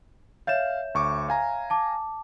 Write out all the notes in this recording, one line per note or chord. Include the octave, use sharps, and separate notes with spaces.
C#5 E5 F5 G6 E7
D2 C#6 D6
F5 G#5 A#5
A5 D6